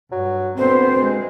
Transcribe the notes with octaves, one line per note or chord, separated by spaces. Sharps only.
G2 F#3
D2 B3 C4 C5
G#3